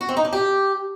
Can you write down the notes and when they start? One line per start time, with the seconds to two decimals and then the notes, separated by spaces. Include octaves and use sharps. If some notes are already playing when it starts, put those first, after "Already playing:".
0.01 F#4
0.09 C4
0.17 D#4
0.25 D4
0.33 G4